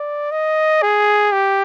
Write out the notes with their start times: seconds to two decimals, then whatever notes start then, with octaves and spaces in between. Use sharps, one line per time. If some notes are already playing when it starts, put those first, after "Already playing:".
Already playing: D5
0.31 D#5
0.82 G#4
1.32 G4